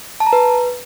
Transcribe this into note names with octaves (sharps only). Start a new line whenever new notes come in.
A5
A#5
B4